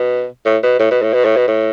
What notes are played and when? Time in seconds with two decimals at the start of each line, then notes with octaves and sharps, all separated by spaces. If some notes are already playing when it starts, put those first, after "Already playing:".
Already playing: B2
0.45 A2
0.63 B2
0.79 A2
0.91 B2
1.02 A2
1.13 B2
1.25 A2
1.36 B2
1.47 A2